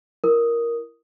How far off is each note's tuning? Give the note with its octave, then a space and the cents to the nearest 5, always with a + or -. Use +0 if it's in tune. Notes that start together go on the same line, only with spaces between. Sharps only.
E4 +25 A#4 +5 D#6 +0